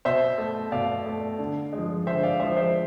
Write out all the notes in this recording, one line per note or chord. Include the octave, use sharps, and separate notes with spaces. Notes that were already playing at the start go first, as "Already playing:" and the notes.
B2 C5 E5
A3
B2 D5 F5
A3
D3
G#3
F3
D3 C5 E5
D5 F5
F3 G#3 C5 E5
C5 E5